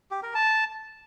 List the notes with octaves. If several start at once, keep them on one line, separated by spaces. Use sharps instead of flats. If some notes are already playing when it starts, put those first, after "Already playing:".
G4
A#4
A5